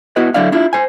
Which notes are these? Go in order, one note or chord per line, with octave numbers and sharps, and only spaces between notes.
B3 E4 F#4 B4 D#5
D3 F#3 D4 E4 D5 F5
D4 E4 F4
C5 G#5